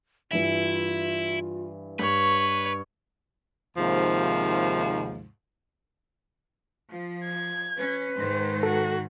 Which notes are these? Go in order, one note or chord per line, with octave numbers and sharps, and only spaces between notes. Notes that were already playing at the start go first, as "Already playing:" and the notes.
G2 E3 E4 F4 E5
G2 B4 C#5 C#6
D#2 G#2 C3 F3
F3
G#6
C#4 B4
G#2 D#3 C5
F#4 A4